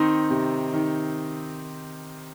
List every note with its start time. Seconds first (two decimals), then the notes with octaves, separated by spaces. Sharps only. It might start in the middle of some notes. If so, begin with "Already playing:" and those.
Already playing: D#3 C4 D#4
0.30 C3
0.73 D#3